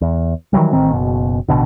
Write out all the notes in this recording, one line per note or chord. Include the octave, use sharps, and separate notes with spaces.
E2
D#3 E3 F#3 G3
A1 D#3 C4
F#1 B2
A1 B2 D3